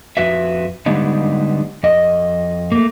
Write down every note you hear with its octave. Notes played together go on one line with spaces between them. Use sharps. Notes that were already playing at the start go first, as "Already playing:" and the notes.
F2 F#4 B4 E5
D3 G3 G#3 B3 D4 D#4
F2 D#5
A3 A#3